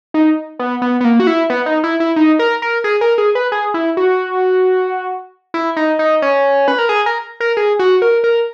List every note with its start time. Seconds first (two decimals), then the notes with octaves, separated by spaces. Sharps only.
0.14 D#4
0.59 B3
0.82 B3
1.01 B3
1.05 A#3
1.20 F#4
1.27 E4
1.50 B3
1.66 D#4
1.84 E4
2.00 E4
2.16 D#4
2.39 A#4
2.62 A#4
2.84 G#4
3.01 A#4
3.18 G#4
3.35 B4
3.52 G#4
3.74 E4
3.97 F#4
5.54 E4
5.76 D#4
5.99 D#4
6.22 C#4
6.68 B4
6.79 A#4
6.89 G#4
7.06 A#4
7.40 A#4
7.57 G#4
7.79 F#4
8.02 A#4
8.24 A#4